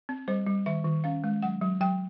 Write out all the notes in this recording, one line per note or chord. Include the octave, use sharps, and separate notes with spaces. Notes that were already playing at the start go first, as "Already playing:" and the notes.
C4
G3 C5
G3
D#3 E5
D#3
C#4 F5
G#3
F#3 F#5
F#3
F#3 G5